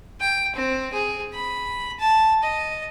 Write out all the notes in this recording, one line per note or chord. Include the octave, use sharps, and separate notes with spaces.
G5
C4
G#4
B5
A5
D#5